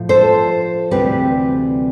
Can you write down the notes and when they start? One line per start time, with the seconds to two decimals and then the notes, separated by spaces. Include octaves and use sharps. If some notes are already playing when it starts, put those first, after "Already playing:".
Already playing: A2 F3
0.09 A4 C5
0.91 D2 C3 E3 G3 C4 G4 B4